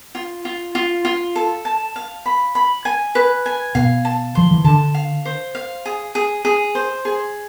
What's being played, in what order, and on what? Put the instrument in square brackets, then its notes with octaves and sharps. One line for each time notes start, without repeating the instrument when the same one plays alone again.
[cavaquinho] F4
F4
F4
F4
A4
A5
F5
B5
B5
G#5
B4
G#5
[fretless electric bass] B2 [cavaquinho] F5
[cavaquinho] A5
[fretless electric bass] F3 [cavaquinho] C6
[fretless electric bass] E3
[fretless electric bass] D3 [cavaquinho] A5
[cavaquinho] F5
C5
F5
G#4
G#4
G#4
C5
G#4